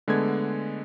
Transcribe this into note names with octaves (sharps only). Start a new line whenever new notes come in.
D3 G#3 A3 B3 G#6